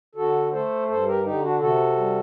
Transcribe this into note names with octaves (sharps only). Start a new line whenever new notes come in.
D3 F#4 A4
A3 A4 C5
G2 A4 C5
G4 A#4
D3 D#4 G4
D4 F#4
C3 F#4 A4
G3